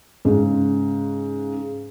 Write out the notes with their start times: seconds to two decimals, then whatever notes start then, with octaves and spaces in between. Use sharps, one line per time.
0.25 G#2 C#3